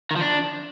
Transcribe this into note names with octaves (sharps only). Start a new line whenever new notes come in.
D#3
F3
D4